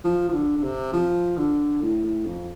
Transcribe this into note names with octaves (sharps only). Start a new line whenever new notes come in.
F3
F3
D3
D3
C3
F3
D3
A2
A2
F2